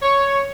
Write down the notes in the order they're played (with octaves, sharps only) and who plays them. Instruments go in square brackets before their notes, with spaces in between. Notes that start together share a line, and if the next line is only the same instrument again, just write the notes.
[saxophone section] C#5